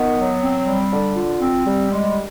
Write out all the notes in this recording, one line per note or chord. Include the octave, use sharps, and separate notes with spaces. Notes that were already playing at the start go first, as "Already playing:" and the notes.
Already playing: D#3 B3
F#3
C4
G3
D3
F4
C4
G3
G#3